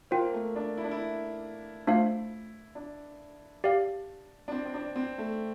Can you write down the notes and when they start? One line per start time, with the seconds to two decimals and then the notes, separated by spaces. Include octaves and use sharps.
0.11 A#3 F4 C5 G5
0.33 A3
0.56 D4
0.77 E4
0.84 D4
0.91 E4
1.87 A3 D4 F4 C5 F5
2.75 D4
3.64 G4 D5 F5
4.48 D4
4.52 C4
4.66 C4
4.74 D4
4.96 C4
5.18 A3